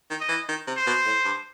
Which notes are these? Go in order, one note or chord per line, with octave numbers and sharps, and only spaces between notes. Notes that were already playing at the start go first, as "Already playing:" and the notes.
D#3
D#5
E3
D#3
C3
C5
B2
A2
G2